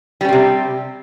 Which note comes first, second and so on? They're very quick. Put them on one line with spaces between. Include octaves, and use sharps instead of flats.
G3 C#4 C4 C3